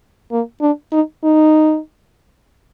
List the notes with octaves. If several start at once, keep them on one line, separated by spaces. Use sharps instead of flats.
A#3
D4
D#4
D#4